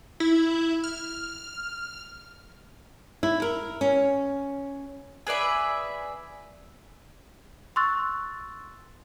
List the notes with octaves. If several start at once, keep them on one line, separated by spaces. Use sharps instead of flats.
E4
F6
E4
A#4
C#4
G#4 B4 D5 E5
C6 C#6 E6 F#6 A6